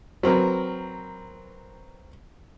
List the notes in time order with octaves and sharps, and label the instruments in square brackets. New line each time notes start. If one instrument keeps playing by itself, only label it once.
[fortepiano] F#3 C4 A#4 B4